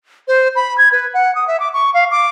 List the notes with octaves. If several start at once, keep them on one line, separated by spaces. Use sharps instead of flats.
C5
B5
G#6
B4
F#5
D#6
E5
D6
C#6
F5
D6